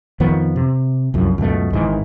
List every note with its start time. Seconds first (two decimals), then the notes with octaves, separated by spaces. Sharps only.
0.20 F2 D#3 F3 B3
0.56 C3
1.14 C2 F#2 F3
1.38 C#2 F#2 B2 A3
1.73 G#1 G#2 D#3 E3